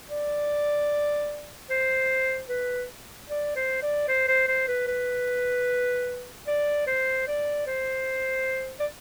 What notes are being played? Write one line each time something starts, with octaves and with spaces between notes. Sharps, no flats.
D5
C5
B4
D5
C5
D5
C5
C5
C5
B4
B4
D5
C5
D5
C5
D5